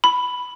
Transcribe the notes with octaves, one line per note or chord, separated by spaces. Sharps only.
B5